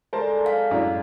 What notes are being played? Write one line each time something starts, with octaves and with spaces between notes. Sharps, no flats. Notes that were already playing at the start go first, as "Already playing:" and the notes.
G#3 A4 A#4 C5 D5 A5
F5
F#2 A2 D4